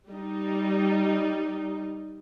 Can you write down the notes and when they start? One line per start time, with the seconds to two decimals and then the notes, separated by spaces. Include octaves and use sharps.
0.11 G3 D#4